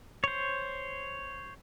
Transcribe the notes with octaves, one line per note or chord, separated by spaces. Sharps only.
C5 C#5